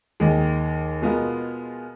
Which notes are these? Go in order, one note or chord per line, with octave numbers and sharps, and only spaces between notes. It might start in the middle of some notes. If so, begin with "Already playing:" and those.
D#2 D#3 G#3
B2 G#3 B3 F4 A#4